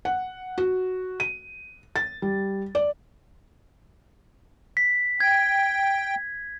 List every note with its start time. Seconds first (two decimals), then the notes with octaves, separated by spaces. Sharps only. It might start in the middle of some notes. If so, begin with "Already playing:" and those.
0.05 F#5
0.58 F#4
1.20 D#7
1.96 A6
2.22 G3
2.75 D5
4.77 B6
5.20 G5 G#6